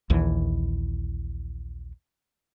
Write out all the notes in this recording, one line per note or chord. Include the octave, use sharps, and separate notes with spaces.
A#1 D#2 E3